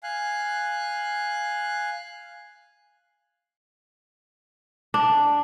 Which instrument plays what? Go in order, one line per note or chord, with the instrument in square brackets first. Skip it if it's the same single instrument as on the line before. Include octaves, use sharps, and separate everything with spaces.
[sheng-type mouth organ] F5 G#5 F#6
[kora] D4